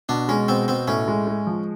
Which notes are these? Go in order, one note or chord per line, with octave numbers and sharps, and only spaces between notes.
B2 D4
G#3 C#4
B2 C4
B2 C4
A2 C#4
G#3
G#3
F3